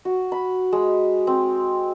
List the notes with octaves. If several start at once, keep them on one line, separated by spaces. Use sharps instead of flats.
F#4
B5
G#3
C4